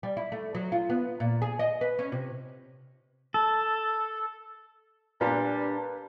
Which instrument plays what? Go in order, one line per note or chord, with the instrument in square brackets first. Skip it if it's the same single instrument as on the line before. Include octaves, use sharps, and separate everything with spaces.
[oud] G3
E4
A3
F#3
F4
B3
A#2
G#4
D#5
B4
C#4
C3
[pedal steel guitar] A4
[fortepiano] A#2 [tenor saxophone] G3 [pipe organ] D4 [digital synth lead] B4